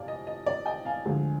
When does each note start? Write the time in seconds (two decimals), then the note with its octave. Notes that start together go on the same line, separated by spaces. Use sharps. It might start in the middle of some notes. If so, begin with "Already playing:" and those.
Already playing: F2 C3 D5 F5 G#5
0.08 D#5
0.27 D#5
0.46 D5
0.66 D#5 G5
0.85 F5 G#5
1.05 D2 D3 F3 G#3